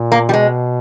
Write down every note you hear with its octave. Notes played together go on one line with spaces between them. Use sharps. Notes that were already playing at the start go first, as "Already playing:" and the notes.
Already playing: A#2
A#3
G3
B2 G#3